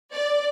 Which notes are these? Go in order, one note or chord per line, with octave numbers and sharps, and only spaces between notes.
D5